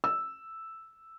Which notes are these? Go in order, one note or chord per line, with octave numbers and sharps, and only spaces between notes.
E6